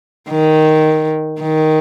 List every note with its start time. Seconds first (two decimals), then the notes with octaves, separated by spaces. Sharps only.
0.30 D#3
1.41 D#3